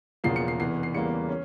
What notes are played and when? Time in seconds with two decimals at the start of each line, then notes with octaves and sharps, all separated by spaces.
0.24 E1 E2 C#3 F3 A#3 C7
0.36 C#7
0.48 C7
0.60 F1 E2 E3 C7
0.83 C7
0.94 E2 C#3 E3 G3 A#3 C#7
1.29 C#4